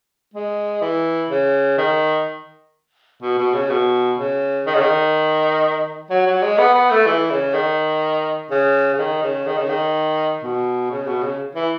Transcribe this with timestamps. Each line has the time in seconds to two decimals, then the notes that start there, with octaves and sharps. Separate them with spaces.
0.34 G#3
0.82 E3
1.30 C#3
1.78 D#3
3.22 B2
3.38 B2
3.54 C#3
3.70 B2
4.18 C#3
4.67 D#3
4.74 C#3
4.82 D#3
6.10 F#3
6.27 F#3
6.43 G#3
6.58 B3
6.75 B3
6.91 A3
7.07 E3
7.31 C#3
7.54 D#3
8.51 C#3
8.94 C#3
8.99 D#3
9.23 C#3
9.47 D#3
9.58 C#3
9.69 D#3
10.43 B2
10.91 C#3
11.07 B2
11.23 C#3
11.55 E3